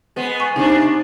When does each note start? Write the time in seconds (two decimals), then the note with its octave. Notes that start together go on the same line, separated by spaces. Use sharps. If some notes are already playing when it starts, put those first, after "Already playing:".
0.16 G#3 B3
0.40 G#5 C#6
0.56 C3 G#3 D4 D#4